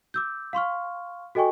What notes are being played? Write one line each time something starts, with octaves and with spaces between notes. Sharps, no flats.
D6 E6 G6
F5 C6 C#6 F6
F#4 A4 D#5 G5 G#5 C#6